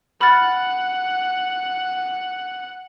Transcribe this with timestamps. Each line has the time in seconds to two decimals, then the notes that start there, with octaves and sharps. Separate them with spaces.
0.21 F#5 B5 F6 A6